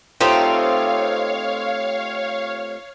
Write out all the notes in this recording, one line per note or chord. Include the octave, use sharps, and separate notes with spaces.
A3 C4 D#4 F4 G4 C#5 F5 G6